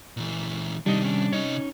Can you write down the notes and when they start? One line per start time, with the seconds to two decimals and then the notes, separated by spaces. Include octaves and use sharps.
0.17 A#2 E3
0.86 C3 D#3 G3 D4 D#4 D#5
1.04 C#4 D4
1.32 C3 C#4 D#4 C#5 D#5